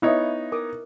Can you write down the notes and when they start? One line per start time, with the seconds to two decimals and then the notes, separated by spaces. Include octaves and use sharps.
0.02 B3 D#4 E4 C#5 D#5 E5
0.52 A#4 D6 D#6